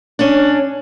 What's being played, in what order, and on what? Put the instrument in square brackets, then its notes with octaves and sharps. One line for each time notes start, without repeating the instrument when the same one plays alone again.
[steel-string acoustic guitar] C#4 D4